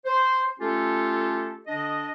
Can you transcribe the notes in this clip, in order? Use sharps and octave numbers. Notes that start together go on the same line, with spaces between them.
C5
A3 C#4 F4 G4 A4
D3 D4 D#5